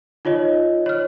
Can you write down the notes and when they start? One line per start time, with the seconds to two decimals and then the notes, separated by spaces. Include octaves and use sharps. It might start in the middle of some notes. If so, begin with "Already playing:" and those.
0.25 D#4 F4 C#5 D#5
0.86 C#5 F6